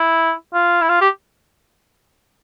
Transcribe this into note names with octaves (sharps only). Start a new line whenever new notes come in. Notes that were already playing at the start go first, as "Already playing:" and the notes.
Already playing: E4
F4
E4
F4
G4